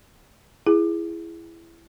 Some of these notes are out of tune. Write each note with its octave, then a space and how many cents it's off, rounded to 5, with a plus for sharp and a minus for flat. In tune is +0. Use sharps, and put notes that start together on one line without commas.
E4 +15 G#4 +0